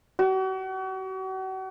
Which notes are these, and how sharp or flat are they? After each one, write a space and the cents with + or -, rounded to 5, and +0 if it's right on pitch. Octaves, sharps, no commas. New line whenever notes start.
F#4 +40